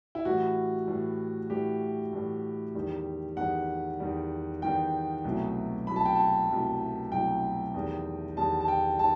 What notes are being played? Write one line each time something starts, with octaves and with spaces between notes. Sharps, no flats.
E4
A2 E3 G3 F#4
A2 E3 G3
A2 E3 G3 G4
A2 E3 G3
E2 D#3 G3
E2 D#3 G3 F#5
E2 D#3 G3
E2 D#3 G3 G5
C2 B2 F#3 A3
C2 B2 F#3 A3 B5
A5
G5
A5
C2 B2 F#3 A3
C2 B2 F#3 A3 G5
E2 D#3 G3
E2 D#3 G3 A5
A5
G5
D#3 G3 A5